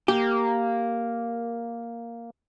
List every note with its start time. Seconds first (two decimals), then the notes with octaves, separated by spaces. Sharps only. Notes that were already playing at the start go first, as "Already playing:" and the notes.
0.08 A#3 G4